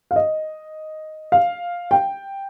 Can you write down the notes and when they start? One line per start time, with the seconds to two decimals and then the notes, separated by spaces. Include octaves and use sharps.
0.11 F5
0.16 D#5
1.32 F5
1.91 G5